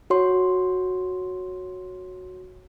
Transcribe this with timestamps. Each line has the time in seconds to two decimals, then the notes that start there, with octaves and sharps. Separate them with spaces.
0.10 F#4 C#5 C6